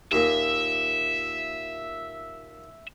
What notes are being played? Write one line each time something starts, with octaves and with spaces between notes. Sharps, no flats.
D#2 A#2 E5